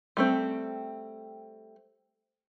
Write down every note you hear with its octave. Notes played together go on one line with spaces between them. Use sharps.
G3 A3 C4